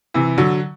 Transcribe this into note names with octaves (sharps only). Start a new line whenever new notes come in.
C3 E3
D3 F#3